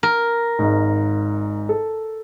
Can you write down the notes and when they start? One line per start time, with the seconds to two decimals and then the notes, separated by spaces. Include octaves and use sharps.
0.03 A#4
0.59 G#1 G#2
1.69 A4